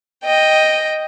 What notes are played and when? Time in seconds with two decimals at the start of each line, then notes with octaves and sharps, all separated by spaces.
0.24 D#5 G5